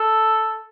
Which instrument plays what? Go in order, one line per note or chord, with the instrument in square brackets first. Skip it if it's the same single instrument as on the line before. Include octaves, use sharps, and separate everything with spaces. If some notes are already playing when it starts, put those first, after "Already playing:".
Already playing: [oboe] A4